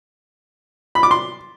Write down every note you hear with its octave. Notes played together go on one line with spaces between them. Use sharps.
B5
D6
C6